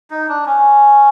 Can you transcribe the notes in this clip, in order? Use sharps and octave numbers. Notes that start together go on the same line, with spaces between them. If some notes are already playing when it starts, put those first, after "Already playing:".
D#4
D4
C#4